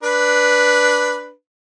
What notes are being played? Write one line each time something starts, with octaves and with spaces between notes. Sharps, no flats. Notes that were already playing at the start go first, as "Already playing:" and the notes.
D4 B4